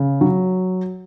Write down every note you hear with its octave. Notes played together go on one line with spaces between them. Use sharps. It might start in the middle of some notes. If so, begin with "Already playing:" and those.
Already playing: C#3
F#3